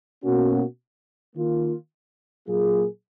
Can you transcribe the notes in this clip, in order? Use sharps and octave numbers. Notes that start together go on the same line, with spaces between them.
B2 A#3 C#4 F#4
D#3 A#3 F4
A#2 F#3 A#3 F4 G#4